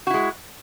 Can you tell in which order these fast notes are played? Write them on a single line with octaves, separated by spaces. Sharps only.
F#4 E4 G#3